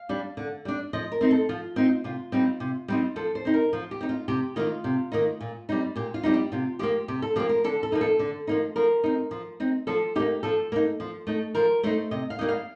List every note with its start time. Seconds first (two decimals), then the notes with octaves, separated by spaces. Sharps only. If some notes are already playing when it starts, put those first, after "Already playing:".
Already playing: F5
0.09 G3 D4
0.37 D3
0.65 G3 D4
0.93 F3 D#5
1.12 A#4
1.21 C4 D#4
1.31 A4
1.49 F3 F4
1.76 C4 D#4
2.04 C3 F4
2.32 G3 C4 D#4
2.60 C3
2.88 G3 C4 D#4
3.16 F3 A4
3.35 C5
3.45 C4 D#4
3.54 A#4
3.73 F3
3.91 G4
4.01 C4 D#4
4.09 F4
4.28 C3 G4
4.56 D#3 A#3 D#4 F4
4.84 C3
5.12 D#3 A#3 D#4
5.41 A#2
5.69 G3 C4 D#4
5.96 A#2 G4
6.14 F4
6.23 G3 C4 D#4
6.34 G4
6.52 C3 F4
6.79 F3 A#3 G4
7.08 C3 G4
7.22 A4
7.36 F3 A#3 G4
7.49 A#4
7.64 D3 A4
7.83 A4
7.92 F3 A#3 D#4
8.01 A4
8.19 D3
8.47 F3 A#3 D#4
8.76 F3 A#4
9.04 C4 D#4
9.31 F3
9.60 C4 D#4
9.87 F3 A4
10.15 A#3 D#4 G4
10.43 F3 A4
10.72 A#3 D#4
11.00 F3
11.27 A3 D#4
11.55 F3 A#4
11.83 A3 D#4 C5
12.11 C3 D#5
12.30 F5
12.39 G3 A#3 D#4
12.48 F5